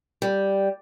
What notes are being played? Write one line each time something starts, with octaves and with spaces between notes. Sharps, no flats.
G3